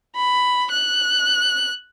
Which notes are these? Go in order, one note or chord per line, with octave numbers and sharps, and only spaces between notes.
B5
F#6